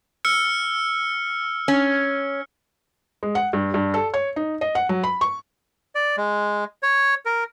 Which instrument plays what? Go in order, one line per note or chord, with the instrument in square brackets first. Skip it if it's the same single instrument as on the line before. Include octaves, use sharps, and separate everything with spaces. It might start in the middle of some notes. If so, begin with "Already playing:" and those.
[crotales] E6 F6 C#7
[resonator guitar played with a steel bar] C#4
[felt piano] G#3
F#5
G2
G2
A4
C#5
D#4
D#5
F#5
F#3
B5
C#6
[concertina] D5
G#3
C#5
A#4